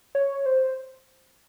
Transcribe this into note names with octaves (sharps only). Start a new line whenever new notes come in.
C#5
C5